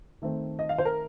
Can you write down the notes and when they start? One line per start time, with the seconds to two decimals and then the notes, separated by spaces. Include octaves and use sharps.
0.22 D#3 A3 C4
0.59 D#5
0.69 F5
0.78 C5
0.85 A#4